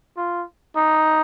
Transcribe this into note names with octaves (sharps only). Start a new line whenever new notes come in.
F4
D#4